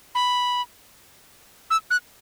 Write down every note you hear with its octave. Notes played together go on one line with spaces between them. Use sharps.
B5
E6
F#6